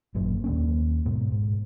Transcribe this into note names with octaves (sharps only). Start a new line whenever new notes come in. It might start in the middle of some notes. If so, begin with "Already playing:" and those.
G#1 F#2 A#2
D#2 A#3 C#4
G#2 B2
G#2